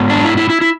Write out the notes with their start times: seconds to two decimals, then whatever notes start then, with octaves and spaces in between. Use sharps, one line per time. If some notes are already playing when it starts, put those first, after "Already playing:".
Already playing: G#2 B3
0.10 D4
0.25 E4
0.37 E4
0.50 E4
0.61 E4